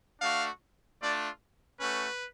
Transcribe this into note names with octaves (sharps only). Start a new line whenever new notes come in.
A3 D4 F#4 F5
A3 D4 F4 D5
A3 C#4 F#4 B4